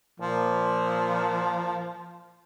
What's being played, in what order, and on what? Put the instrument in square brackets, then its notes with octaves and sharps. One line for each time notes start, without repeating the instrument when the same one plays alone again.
[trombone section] A#2 [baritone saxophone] F3